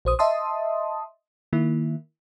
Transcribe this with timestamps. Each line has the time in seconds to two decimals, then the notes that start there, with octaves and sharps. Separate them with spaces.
0.05 A#1 C5 D#6
0.19 D#5 E5 A5 C6 D#6
1.53 D#3 A#3 E4